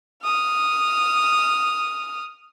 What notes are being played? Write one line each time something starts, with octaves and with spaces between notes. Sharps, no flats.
D#6 F6